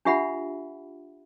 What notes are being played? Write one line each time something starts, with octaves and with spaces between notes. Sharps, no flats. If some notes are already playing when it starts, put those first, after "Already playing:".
D4 F4 G4 E5 F#5 B5